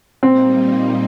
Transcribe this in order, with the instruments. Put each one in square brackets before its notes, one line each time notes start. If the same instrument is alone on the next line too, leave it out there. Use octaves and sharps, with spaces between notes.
[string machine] A#2 G3 A#3 D#4 [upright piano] C4